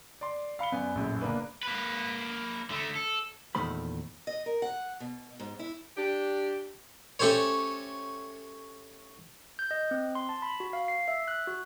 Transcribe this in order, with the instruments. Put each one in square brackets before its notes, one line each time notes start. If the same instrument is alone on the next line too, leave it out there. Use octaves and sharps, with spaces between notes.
[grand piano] D5 C6
F5 B5 C#7 G7
F#2 B3 D5 G#5
A#1 F#2 A2
F#1 A#3 B3 D4 B4
[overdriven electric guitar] A#3 B4
D3 A3
A4
[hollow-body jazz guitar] E2 A#2 D#3 A3 C5 B5
[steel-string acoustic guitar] D#5
A#4
F#5
B2
G#2
E4
[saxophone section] D4 G4
[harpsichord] A3 C#4 G4 A4 C5 C#5
[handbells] G6
D#5
C4
C6
A5
B5
F#4
F5
C7
E5
F#6
F#4